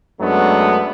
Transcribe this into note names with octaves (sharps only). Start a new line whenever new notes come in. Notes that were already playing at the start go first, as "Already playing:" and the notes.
F#2 F#3 G#3 A3 B3 D4